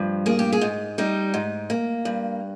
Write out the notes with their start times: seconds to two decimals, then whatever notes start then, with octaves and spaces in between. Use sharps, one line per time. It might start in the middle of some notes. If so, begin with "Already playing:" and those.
Already playing: G2 F3
0.26 A#3 G#4
0.39 G4
0.52 G#4
0.61 G#2
0.98 G3 D#4
1.34 G#2
1.70 A#3
2.05 G2